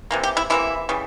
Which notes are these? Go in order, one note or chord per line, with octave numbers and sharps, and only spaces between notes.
C3 E3 A#3
G4
E4
C3 E3 A#3 E4
C#3 E3 G3